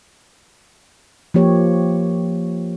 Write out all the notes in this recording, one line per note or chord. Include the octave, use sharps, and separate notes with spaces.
F3 A#3 G4 C#5